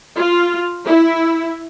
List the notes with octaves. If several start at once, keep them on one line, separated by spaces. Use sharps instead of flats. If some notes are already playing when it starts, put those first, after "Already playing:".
F4
E4